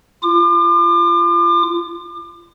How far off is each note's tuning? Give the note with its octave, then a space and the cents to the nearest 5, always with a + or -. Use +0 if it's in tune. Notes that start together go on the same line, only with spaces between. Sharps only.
F4 -30 D6 +40